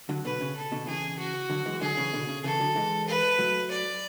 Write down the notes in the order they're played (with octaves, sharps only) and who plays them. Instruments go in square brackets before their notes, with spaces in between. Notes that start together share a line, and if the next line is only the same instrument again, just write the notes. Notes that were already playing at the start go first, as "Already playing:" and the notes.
[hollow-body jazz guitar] D3 F#3
[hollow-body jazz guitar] B2 D3 [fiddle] B4
[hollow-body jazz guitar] C#3
[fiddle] A4
[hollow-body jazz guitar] B2 D3
[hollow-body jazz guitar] C#3 E3 [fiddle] G#4
[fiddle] F#4
[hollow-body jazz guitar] D3 F#3
E3 G#3
[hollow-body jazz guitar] D3 F#3 [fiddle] G#4
[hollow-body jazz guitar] C#3 E3
B2 D3
C#3
[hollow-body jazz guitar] C#3 E3 [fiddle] A4
[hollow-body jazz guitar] D3 F#3
E3 G#3
[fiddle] B4
[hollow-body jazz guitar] F#3 A3
[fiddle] D5